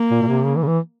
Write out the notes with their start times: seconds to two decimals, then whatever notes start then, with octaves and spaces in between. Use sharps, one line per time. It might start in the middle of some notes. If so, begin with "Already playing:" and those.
Already playing: A#3
0.11 A#2
0.22 A#2
0.27 C3
0.45 C#3
0.56 E3
0.63 C#3
0.67 E3